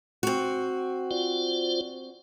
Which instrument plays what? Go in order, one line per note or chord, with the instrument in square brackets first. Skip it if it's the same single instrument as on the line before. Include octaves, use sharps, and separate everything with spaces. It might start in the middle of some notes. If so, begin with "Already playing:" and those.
[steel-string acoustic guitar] C4 F#4
[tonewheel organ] F4 C5 D5